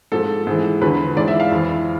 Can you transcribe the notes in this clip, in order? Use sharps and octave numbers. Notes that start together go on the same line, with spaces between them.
G#2 F3 A4
G#2 E3
E2 D3 F3 B4
G#2 E3 D5
E5
F5
F2 E3